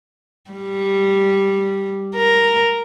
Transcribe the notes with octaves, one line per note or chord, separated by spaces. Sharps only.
G3
A#4